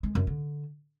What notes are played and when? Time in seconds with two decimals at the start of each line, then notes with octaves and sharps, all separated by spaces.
0.03 G#3
0.15 F#2
0.27 D3